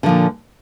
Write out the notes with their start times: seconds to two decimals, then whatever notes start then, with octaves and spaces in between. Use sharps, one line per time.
0.03 D3
0.06 F3
0.09 A#2